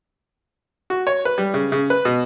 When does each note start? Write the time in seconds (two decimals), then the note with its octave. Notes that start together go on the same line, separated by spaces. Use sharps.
0.90 F#4
1.07 C#5
1.25 B4
1.38 G3
1.54 C#3
1.72 C#3
1.90 B4
2.05 B2